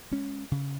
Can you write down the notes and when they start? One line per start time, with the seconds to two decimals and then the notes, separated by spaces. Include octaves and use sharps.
0.11 G#3 C#4
0.52 C#3